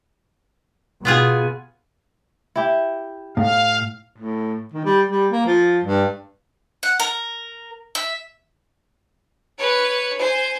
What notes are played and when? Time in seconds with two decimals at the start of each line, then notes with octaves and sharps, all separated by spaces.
1.05 B2 B3 F4 G#4
2.56 E4 G4
3.37 A2 F5
4.17 A2
4.73 D#3
4.85 G3
5.10 G3
5.32 A#3
5.46 F3
5.84 G2
6.83 F#5
7.00 A#4
7.95 E5
9.58 B4 C#5
10.18 C5 G#5